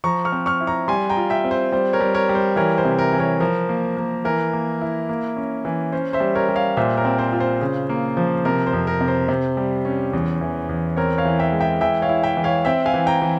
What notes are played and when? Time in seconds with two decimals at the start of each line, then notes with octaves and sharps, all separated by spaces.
0.04 F3 A#5 C#6
0.25 C#6 F6
0.32 C4
0.46 C#6 F6
0.60 E4
0.67 A#5 C#6
0.88 G3 G#5 C6
1.09 G5 A#5
1.17 F4
1.30 E5 G5
1.44 C4
1.51 C5
1.72 G3 C5
1.93 A#4 C#5
2.01 G3
2.15 A#4 C#5
2.29 G3
2.35 C5
2.56 E3 A#4 C#5
2.78 C5
2.85 C3
2.99 A#4
3.13 E3
3.19 A#4 C#5
3.40 F3 A#4
3.69 A#3
3.97 A#3
4.25 E3 A#4
4.53 A#3
4.81 E4
5.09 A#3
5.37 C#4
5.65 E3
5.92 C#4 C5
6.13 C5 E5
6.20 G3
6.35 A#4 C#5
6.49 G3
6.56 C#5 F5
6.77 A#2 C5 E5
6.97 A#4 C#5
7.05 C4
7.19 C5
7.32 F4
7.40 C5
7.62 C#3
7.89 A#3
8.17 F3
8.45 C3 A#4
8.67 C5
8.73 F2
8.87 A#4
9.01 C3
9.08 C5
9.28 C3
9.57 G3
9.85 C#4
10.13 E2
10.41 E3
10.69 E2
10.97 C4 A#4 C#5
11.18 C#5 F5
11.25 E3
11.39 E5 G5
11.53 G#3
11.61 E5 G5
11.81 E3 E5 G5
12.02 C#5 F5
12.09 E4
12.23 E5 G5
12.37 E3
12.44 C#5 F5
12.65 C4 E5 G5
12.86 F5 G#5
12.94 E3
13.07 G5 A#5
13.22 E3